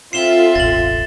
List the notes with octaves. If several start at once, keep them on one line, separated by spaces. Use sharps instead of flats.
C4 F4 A4 E5 C7 E7 G7
E1 A1 A6 F#7